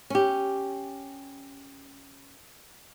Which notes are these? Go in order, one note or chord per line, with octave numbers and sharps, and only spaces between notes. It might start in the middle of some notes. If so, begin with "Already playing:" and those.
C#4 G4